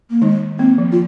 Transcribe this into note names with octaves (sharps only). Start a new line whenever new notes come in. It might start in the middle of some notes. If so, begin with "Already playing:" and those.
A#3
D#3 G#3 D#4
A#3 C4
F3
F4